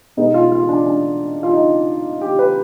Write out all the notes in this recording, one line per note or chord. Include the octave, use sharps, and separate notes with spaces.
B2 G#3 B3 D#4
F4
F4
D4
D4
F4
D#4
G4
B4